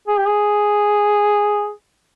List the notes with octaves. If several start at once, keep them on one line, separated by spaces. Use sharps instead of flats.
G#4
G4
G#4